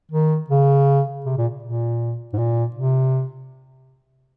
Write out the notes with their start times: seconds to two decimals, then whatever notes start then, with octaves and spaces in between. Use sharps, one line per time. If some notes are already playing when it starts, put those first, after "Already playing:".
0.12 D#3
0.50 C#3
1.25 C3
1.38 A#2
1.63 A#2
2.33 G#2
2.38 A#2
2.76 C3